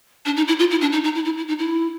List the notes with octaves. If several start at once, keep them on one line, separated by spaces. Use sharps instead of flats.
D4
D#4
E4
F4
E4
D4
D#4
D#4
E4
E4
E4
D#4
E4